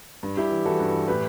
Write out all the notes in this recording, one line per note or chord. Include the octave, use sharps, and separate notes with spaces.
G2
G2 E4 G4
E3
E3 F#4 A4
G2
E3
A2 G4 B4